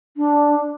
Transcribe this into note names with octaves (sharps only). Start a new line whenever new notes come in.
D4